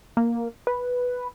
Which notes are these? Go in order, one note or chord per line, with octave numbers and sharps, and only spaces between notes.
A#3
B4